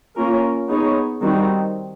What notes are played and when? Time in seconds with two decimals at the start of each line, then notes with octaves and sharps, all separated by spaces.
0.16 A#3 C#4 F4 A#4
0.68 G#3 B3 D#4 G#4 C#5
1.21 D#3 G3 C4 D#4 F#4